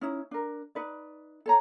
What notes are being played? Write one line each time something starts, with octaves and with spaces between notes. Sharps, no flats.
C#4 D#4 E4
D4 A#4
D#4 B4 D5
A4 C#5 A#5